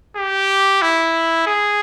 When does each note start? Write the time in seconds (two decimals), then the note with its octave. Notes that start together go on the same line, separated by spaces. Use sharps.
0.17 G4
0.82 E4
1.47 G#4